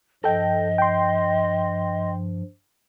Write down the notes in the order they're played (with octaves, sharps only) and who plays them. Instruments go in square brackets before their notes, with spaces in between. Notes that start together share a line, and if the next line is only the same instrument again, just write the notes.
[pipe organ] G2 F3 [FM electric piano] A4 G5 [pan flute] D#5
[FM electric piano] G5 C6